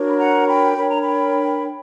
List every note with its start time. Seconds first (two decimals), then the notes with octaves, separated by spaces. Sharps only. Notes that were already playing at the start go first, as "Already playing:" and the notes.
Already playing: D4 F#4 A#4 C#5
0.09 B5
0.17 F#5 A#5
0.47 G5 B5
0.77 D4 A#4 C#5 B5
0.90 A#5
1.01 G5 B5